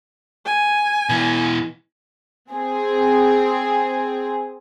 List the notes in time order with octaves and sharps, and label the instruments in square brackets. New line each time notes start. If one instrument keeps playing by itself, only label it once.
[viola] G#5
[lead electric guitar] B2 E3
[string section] C4 G#4